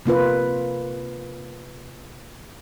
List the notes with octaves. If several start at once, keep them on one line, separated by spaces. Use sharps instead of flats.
C3 A#3 F4 B4